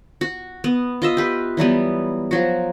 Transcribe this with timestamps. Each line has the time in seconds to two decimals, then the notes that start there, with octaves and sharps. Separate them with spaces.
0.21 F#4
0.64 B3
1.02 F4 D#5 E5
1.17 G4 B4
1.57 E3 F#3 G3 B3
2.31 F3 F#3 F#4